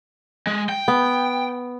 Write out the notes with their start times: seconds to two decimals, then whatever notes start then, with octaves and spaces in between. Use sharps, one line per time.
0.47 G#3
0.69 G5
0.88 B3